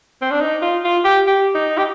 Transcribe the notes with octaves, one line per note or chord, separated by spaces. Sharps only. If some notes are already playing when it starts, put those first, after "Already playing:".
C4
D4
D#4
F4
F4
G4
G4
D#4
G4